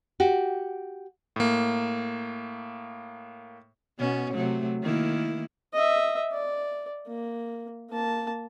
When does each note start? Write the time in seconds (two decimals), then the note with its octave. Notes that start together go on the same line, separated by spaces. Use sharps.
0.20 F#4 G4
1.36 A2 A#3
3.99 B2 B3 C#4
4.33 C3 F#3 A3
4.82 D#3 A#3 E4
5.74 D#5 E5
6.33 D5
7.07 A#3
7.90 A#3 A5